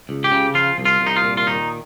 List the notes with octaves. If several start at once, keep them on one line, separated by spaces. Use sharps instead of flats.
C#2
G4
C#3
F3 F4
C2
F4
C2
D#4
F4
A#2
F4
D#3 D#4